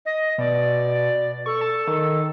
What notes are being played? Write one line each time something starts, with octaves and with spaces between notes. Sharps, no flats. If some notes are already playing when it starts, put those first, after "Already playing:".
D#5
B2 D5
A4 C#6
A5
D#3